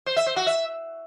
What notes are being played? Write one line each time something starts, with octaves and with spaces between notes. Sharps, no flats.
C5
E5
C5
F#4
E5